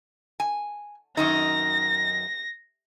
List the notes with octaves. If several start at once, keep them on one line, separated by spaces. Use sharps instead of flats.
G#5
F#2 D#3 D#4 A#6